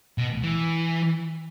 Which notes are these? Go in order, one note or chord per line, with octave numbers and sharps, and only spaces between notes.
B2
E3